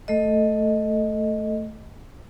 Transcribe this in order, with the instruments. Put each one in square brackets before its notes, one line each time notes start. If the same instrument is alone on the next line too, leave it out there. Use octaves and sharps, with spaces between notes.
[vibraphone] A3 A4 D#5